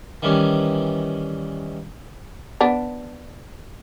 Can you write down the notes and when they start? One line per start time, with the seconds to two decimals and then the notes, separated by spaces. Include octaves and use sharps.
0.22 D#3 E3 G3 C#4
2.61 B3 D4